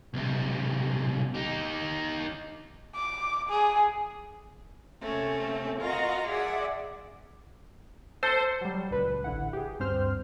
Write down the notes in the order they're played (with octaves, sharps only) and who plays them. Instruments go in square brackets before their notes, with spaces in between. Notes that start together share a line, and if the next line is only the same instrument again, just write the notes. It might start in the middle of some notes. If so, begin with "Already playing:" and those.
[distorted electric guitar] B1 C3
D#4 G4
[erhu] D6
G#4
[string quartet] C3 A3 A#3 C4 C#4
F4 F#4 A#4 D#5 A#5
G#4 D5 E5 F#5
[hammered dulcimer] A4 [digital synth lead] C5
[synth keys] F#3 G3
C#2 A#2 B4
A1 D3 E4 F#5
G4 G#4
D2 G2 C4 C5 F6